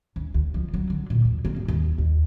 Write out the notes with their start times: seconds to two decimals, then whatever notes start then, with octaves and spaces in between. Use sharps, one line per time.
0.16 D2
0.34 D2
0.54 F3
0.74 F#3
0.90 D3
1.10 A#2
1.25 E2
1.45 A#3
1.56 G#2
1.68 D#2
1.98 D#2